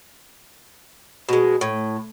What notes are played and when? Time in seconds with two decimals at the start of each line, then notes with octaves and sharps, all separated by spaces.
1.29 B2 G#3
1.61 A2